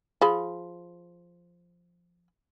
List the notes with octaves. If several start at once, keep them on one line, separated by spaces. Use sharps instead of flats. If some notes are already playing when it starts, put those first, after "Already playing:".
F3 G#4 B5